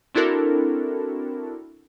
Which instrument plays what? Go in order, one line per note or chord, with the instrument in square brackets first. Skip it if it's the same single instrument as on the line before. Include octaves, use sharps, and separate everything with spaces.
[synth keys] C4 D4 E4 F#4 A4 A#4